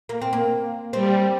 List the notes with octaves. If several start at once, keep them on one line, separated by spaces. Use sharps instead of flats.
A#3
C4
A#3
G3 C4